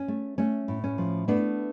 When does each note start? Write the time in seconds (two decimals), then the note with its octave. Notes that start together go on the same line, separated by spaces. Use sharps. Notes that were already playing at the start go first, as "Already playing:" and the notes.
Already playing: C#4
0.08 A3
0.38 A3 C#4
0.68 A2
0.84 C#4
0.98 F3
1.28 A3 B3 D4